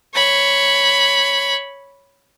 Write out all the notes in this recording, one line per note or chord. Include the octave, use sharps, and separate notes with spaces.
C#5 B5